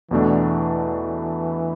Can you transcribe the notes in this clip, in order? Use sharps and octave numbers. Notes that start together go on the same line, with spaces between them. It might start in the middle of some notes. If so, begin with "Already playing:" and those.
E2 B2 E3 A3 D4